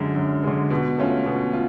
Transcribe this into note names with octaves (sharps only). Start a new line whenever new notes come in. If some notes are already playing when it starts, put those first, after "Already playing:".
Already playing: F#2 D3 G#3
F#2
D3 G#3
B2
A3 C#4 F4
B2
F4